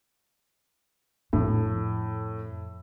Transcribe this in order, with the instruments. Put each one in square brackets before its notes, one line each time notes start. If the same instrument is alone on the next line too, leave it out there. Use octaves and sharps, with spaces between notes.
[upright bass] F2 [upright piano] A2